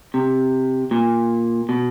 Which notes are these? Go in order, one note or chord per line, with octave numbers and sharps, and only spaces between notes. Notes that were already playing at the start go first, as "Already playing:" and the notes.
C3
A#2
B2